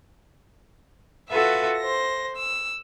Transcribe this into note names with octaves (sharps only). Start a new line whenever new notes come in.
F4 F#4 A4 B4 E5
C5 A#6
E6